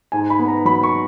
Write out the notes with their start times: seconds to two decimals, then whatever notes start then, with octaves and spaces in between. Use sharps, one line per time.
0.12 G#2 G#5
0.30 B5
0.39 B3
0.48 A#5
0.65 F#3 B5
0.83 C#6